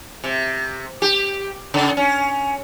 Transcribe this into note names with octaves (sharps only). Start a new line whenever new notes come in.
C3
G4
C#3
C#4